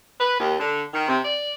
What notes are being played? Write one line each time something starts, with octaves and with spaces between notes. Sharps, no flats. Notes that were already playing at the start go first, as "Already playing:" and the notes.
B4
D#2
D3
D#3
C3
D5